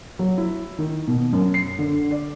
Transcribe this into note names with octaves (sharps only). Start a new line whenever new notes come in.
F#3
E4
D#3
B2
F#2
C7
D3
D5